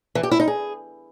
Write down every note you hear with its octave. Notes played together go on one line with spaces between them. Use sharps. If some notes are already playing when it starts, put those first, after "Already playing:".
E3
G4
E4
D#4
G#4